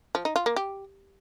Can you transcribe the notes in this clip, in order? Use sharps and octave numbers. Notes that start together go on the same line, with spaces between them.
F3
D#4
F4
A#3
G4